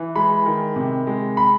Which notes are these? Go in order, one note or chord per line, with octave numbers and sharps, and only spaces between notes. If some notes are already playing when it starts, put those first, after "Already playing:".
Already playing: E3
G#3 B5
D#3
C3
G#3
B5